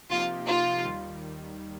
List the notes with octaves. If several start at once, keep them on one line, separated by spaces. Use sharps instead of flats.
C3 F3 A#3 D#4 F4 G4
C3 F3 A#3 D#4 F4 G4
D#2 D#3 G3
D#3 G3